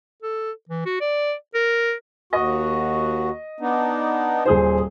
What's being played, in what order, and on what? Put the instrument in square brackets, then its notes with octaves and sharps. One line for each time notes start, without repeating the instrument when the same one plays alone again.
[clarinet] A4
E3
F#4
D5
A#4
[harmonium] D#2 F#4 [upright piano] D#5
[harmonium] B3 D4 D#4
[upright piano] D#1 G#4 C5